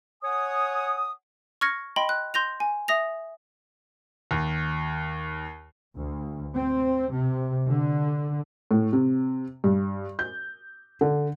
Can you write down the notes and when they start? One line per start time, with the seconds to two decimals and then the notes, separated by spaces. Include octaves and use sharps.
0.23 C#5 F#5 G#5 D#6
1.61 C#6 F6 G#6 A#6 C#7
1.96 D#5 G5 B5 C6
2.09 F#6
2.34 C6 G6 A#6 F7
2.60 G#5
2.88 E5 D#6 A#6 F7
4.31 D#2
5.96 D2
6.55 C4
7.12 C3
7.69 D3
8.71 A2
8.93 C3
9.64 G2
10.19 G6
11.01 D3